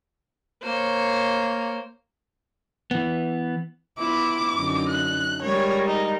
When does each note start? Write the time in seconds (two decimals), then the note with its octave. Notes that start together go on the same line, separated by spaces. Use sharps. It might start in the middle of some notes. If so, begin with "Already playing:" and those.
0.63 A#3 C5 C#5
2.91 E3 B3
3.99 B3 E4 F4 D6
4.56 F#2 D3 D#4
4.89 F#6
5.42 G3 G#3 A#4 C#5
5.87 D#4